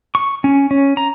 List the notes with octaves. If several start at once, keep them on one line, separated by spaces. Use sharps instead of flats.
C#6
C#4
C#4
A#5